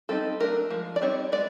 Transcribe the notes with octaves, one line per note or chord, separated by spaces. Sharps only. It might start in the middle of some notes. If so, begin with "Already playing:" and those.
G3 C4 D#4 A4
F#3 A3 D4 A#4
F3 G#3
D5
G3 C4 D#4 C#5
G#3 B3 D5